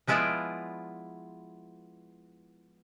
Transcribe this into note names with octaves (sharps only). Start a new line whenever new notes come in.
F3 G#3 B3 E4 F4 D5